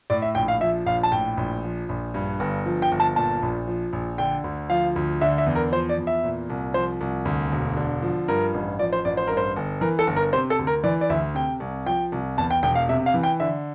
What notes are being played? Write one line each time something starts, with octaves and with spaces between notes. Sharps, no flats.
A2 D5
E5
A#1 G5
F5
F3 E5
A#1 F5
A5
A2 G5
A#1
F3
A#1
G2
G1
F3
G5
G1
A5
A#2 A5
A#1
F3
A#1
D3 G5
D2
F3 F5
D2
D3 E5
E5
E2
A#4
F3 C5
D5
E2
E5
A#2
C2
F3 C5
C2
D2
E1
D3
F3
G2 A#4
A1
F3 D5
C5
A1 D5
C5
G2 A#4
C5
G1
E3 A#4
A4
G1
A#4
C3 C5
A4
D2
A#4
E3 D5
D5
D2 E5
C3 G5
C2
F3 G5
C2
E2 A5
G5
E1 G5
F5
C3 E5
F5
E3
G5
D3 E5